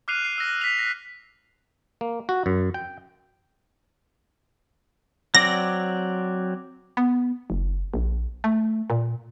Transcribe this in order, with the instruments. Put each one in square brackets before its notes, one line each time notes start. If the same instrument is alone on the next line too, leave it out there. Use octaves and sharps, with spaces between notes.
[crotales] D6 F6 F#6 C7 D#7 F7
C7
E6 A#6
B6 F7
A#6
[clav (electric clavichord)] A#3
F#4
F#2
G5
[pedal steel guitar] F#3 C4 D5 [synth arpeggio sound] A#6
[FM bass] B3
F#1
A#1
A3
A#2